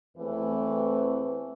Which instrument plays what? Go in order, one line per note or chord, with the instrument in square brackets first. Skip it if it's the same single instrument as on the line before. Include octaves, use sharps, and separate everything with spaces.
[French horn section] E2 E3 A3 C4 B4